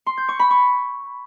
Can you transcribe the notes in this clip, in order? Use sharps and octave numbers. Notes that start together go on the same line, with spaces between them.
C6
G6
C#6
B5
C#6